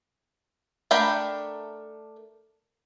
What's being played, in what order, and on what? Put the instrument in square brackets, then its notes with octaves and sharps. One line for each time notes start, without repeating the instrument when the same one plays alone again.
[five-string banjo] A3 D4 A#4 G5 B5